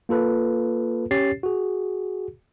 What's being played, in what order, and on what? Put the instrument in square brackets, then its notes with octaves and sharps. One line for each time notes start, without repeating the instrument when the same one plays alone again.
[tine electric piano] A#3 F4 A4 B4
C#4 G4 C#5 A6 C7
F#4 G#4